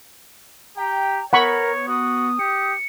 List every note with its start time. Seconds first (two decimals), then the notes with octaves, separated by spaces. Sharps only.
0.77 G4 G5 A#5
1.33 B3 A#4 C#5 F#5 B5 C#6
1.88 F#4 D#6
2.39 G4 C#7